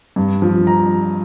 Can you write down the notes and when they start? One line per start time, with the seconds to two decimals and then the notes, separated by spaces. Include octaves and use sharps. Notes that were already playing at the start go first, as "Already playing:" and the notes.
0.16 G2
0.42 F3
0.67 A#5